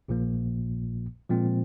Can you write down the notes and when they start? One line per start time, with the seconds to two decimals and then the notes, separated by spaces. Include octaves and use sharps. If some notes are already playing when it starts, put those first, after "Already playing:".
0.08 A#1 A#2 F3 A#3
1.29 A#2 F3 G#3 C4